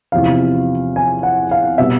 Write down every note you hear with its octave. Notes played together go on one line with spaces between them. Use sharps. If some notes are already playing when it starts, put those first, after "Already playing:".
E2 C3 F3 F5
G#5
F#5
F5
B2 G3 B3 E5